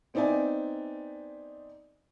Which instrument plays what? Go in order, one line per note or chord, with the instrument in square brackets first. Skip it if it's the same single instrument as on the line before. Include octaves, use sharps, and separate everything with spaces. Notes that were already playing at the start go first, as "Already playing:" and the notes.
[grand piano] B3 C4 D#4 D5 E5 G#5